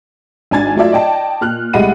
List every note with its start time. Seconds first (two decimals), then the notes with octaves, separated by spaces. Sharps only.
0.51 G#1 D4 G#5 G#6 A6
0.75 F#3 A3 F4 D5 E5
0.92 D5 D#5 G5 A5
1.41 A#2 F6 F#6
1.73 C2 G#3 A3 F#5 B5 D#7